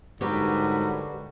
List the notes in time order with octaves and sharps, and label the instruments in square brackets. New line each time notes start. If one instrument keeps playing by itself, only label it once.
[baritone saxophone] G#2 [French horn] D3 [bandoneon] F#3 G3 F#4 [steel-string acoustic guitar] G4 A#4 B4